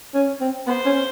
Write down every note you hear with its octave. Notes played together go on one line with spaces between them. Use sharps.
C#4
C4
B3 C5
C#4